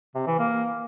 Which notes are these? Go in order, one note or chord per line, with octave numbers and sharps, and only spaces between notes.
C3
E3
A#3